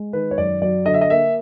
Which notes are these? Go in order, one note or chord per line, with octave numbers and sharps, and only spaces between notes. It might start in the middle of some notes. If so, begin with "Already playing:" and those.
Already playing: G#3
D#3 B4
C#5
F#2 D5
F#3 D5
D3 D#5
E5
D#5
A#3 E5